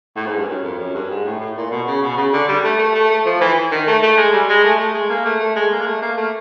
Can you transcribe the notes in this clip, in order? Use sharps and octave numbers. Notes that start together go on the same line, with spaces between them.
A2
G#2
G2
F#2
F2
F#2
G2
G#2
A2
A2
A#2
B2
C#3
B2
C#3
D3
G3
A3
A3
A3
A3
F3
E3
D#3
A3
A3
G#3
G3
G#3
A3
A3
G#3
A#3
A3
A3
G#3
A#3
G#3
A3
A#3
A3